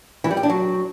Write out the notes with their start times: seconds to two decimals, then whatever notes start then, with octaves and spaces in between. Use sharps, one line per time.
0.24 E3
0.31 G3
0.37 G4
0.43 D4
0.50 F#3